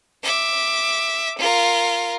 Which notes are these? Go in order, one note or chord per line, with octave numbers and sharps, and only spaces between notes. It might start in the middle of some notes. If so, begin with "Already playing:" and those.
E5 D6
F4 A#4